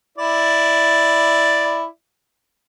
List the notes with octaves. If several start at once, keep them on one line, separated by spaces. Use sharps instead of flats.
E4 D5